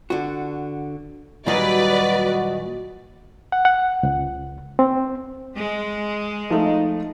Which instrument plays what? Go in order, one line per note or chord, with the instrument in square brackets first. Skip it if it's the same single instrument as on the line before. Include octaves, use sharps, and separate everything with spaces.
[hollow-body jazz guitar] D3 F#4
[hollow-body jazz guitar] A#2 D#3 F#3 [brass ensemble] G3 F#4 [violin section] B4 D5 [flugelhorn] D#5
[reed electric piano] F#5
F#5
C#2
C4
[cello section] G#3
[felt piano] F3 A3 [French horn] D#4